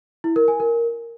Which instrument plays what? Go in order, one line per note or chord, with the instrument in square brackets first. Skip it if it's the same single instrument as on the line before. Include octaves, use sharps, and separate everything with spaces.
[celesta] E4
A#4
G#5
A#4